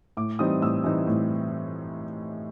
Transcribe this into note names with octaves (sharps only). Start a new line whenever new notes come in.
A2 D6
E3 G3 C4 D#4 D#6
A2 E6
E3 G3 C4 D#4
A2